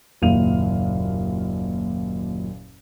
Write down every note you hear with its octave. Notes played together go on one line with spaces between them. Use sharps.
F#1 D#2 A#2 F5 D#7 F7